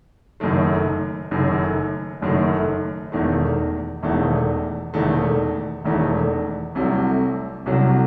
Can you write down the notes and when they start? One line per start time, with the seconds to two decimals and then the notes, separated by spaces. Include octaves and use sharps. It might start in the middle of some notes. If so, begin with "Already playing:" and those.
0.40 F#1 F#2 D#3 A3
1.31 F#1 F#2 D#3 A3
2.22 F#1 F#2 D#3 A3
3.12 E1 E2 D#3 A3
4.03 E1 E2 D#3 A3
4.94 E1 E2 D#3 A3
5.84 E1 E2 D#3 A3
6.75 C2 C3 F#3 A3
7.66 C2 C3 F#3 A3